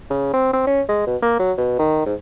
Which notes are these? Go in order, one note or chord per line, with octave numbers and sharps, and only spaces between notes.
C#3
C4
C4
C#4
G#3
B2
A#3
F#3
B2
D#3
G#2